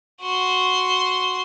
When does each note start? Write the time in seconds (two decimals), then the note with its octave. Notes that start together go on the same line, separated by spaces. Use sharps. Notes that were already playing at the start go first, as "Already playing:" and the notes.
0.21 F#4 C6